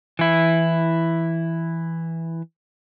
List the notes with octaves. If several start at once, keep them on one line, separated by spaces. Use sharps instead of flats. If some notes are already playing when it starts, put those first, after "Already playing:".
E3 E4